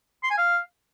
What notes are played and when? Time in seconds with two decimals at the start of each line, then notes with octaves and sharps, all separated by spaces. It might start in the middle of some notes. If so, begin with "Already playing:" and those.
0.23 C6
0.30 G#5
0.38 F5